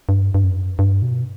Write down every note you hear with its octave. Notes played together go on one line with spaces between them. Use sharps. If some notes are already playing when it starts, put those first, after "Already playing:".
G2
G2
F#2
G2
B2